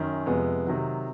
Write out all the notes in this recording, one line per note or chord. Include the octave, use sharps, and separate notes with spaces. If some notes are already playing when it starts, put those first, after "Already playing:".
Already playing: F#2 D#3 C#4
F2 C3 F3 G#3 B3
C3 D#3 F#3